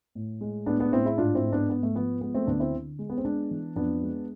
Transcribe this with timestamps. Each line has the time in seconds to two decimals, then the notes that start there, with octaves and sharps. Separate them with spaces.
0.15 A2
0.41 G#3
0.66 A2 B3 D4
0.80 B3 D4
0.93 A2 C4 E4
1.05 E4 G#4
1.18 G#2 D4 F4
1.35 C4 E4
1.45 G#2
1.53 B3 D4
1.69 G#2 B3
1.83 A3
1.96 F3 B3
2.21 G#3 B3
2.34 A3 C4
2.47 D2 B3 D4
2.60 C4 E4
2.73 D3
2.99 G#3
3.10 B3
3.18 C4
3.25 G#3 B3 D4
3.51 E3
3.76 F2 B3 D4
4.02 G#3